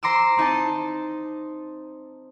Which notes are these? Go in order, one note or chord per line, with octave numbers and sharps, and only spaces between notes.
C5 A#5 C6 D6 E6
C4 D#4 D#5 A5